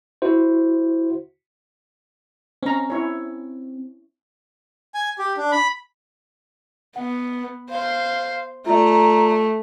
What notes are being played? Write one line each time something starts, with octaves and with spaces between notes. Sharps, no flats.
E4 F#4 C5
C4 C#4 A#5
E4 C#5
G#5
G4
D4
B5
B3 F#5
C5 F5
A3 F4 D5 A#5